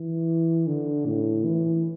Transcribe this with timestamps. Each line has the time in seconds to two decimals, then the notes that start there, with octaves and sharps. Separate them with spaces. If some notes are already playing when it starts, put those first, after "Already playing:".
Already playing: E3
0.67 D3
1.06 A2
1.44 E3